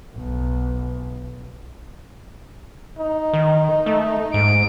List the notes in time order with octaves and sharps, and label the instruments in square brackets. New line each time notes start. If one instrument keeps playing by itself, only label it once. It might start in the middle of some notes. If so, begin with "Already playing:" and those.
[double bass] B1
[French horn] D#4
[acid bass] D#3
A3
[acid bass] G#2 [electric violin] D7